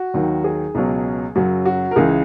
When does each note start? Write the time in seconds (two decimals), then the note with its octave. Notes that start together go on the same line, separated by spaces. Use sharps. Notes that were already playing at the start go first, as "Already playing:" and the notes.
Already playing: F#4
0.14 D#2 D#3 F#3
0.44 G#4
0.75 C#2 B2 F#3
1.35 F#2 C#3 F#3 F#4
1.65 F#4
1.91 A#4
1.96 C#2 C#3 E3 G#4